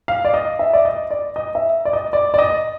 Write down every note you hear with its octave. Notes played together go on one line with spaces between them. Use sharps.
F5
D5
D#5
E5
D5
D#5
D5
D#5
E5
D5
D#5
D5
D5
D#5